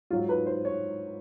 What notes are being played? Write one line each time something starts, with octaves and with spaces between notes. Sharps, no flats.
G#2 D#3 F#3 F4
B4
C5
C#5